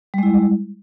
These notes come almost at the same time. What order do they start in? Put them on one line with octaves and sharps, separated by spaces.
G3 G#3 E4